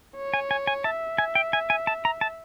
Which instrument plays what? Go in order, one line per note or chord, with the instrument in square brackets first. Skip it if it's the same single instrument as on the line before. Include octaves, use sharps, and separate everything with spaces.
[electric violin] C#5
[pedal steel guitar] G#5
G#5
G#5
[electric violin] E5 [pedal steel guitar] A5
[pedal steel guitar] G#5
G5
G#5
G#5
A5
A#5
A5